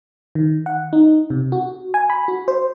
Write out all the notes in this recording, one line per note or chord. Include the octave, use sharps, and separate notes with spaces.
D#3
F#5
D#4
C3
F#4
G#5
B5
F#4
C5